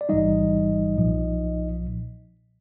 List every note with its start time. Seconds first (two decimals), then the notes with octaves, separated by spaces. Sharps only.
0.01 D5
0.09 A1 G#2 E3 G3 D#4 D#5
0.98 B1 A#2 F3